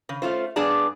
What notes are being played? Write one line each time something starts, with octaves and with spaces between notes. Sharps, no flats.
C#3
A3 C#4 F4 C5
G2 B3 D4 G#4 D5 A5